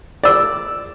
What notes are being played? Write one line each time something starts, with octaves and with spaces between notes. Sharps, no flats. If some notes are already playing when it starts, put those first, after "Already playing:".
D5 E6